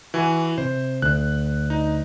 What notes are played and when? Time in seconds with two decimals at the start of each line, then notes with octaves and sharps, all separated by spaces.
0.14 E3 F#4 G#5
0.58 C3 C5
1.02 D2 F#6
1.70 D#4